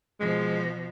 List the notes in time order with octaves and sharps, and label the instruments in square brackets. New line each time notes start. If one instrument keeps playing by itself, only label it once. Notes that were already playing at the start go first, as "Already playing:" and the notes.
[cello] B2 F3 [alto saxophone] G#3